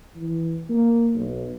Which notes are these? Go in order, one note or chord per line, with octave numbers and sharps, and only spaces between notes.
E3
A#3
B1